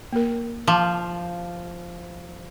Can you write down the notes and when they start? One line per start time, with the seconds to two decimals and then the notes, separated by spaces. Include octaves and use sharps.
0.13 A#3 A#4
0.67 F3 A5 C6 D6